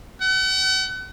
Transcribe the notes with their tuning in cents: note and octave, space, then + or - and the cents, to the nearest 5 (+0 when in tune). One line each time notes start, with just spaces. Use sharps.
F#5 +40